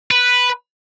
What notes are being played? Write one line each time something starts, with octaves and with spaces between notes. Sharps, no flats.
B4